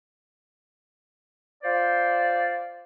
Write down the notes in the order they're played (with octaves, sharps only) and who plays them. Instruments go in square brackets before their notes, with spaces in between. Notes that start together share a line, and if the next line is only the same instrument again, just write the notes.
[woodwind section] F4 C5 D5